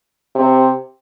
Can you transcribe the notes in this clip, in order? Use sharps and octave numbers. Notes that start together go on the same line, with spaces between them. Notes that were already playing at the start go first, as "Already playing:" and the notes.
C3